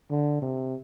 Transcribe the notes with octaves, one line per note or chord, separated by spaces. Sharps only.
D3
C3